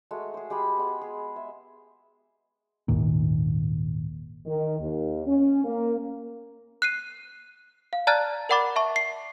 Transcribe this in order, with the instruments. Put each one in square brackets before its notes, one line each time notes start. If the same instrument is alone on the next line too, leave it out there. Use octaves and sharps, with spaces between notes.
[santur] G#3 A3 F#4
G#4 C5
G#3 G4 G5 B5
G#3 B3
G#4
E5
[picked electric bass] G#1 D#2 A#2
[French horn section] D#3
D#2
C#4
A#3
[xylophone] F#6 C7 D#7
F5
D5 A5 A#5 F6 F#6 A6
A#4 D5 F#5 B5 D6 A6
E5 A5 C#6
C7